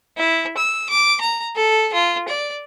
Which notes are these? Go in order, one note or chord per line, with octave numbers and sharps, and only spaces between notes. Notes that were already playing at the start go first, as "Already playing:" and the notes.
E4
E6
D6
A#5
A4
F4
D5